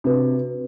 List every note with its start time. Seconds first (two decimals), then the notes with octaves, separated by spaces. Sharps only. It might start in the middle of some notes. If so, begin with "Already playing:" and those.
0.04 C3 D4 F#4 B4